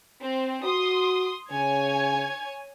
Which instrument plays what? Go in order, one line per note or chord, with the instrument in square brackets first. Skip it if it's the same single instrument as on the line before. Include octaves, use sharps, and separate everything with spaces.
[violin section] C4
[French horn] F#4 [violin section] C6 D#6
[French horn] C#3 [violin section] C#5 G#5 G#6